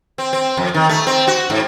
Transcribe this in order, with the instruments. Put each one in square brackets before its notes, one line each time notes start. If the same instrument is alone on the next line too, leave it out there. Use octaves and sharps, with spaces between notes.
[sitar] C4
C4
F2
D#3
A3
C4
F#4
G#2